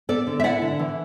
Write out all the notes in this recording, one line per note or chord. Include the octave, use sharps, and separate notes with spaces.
B3 A4 D5
D3
E5
E4 D5 F#5
D3
E3